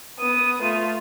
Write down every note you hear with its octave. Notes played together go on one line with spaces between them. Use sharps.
B3 D#6
A3 F4